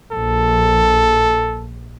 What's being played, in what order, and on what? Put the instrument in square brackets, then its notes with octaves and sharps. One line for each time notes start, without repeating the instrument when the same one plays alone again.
[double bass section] A#1 [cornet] A4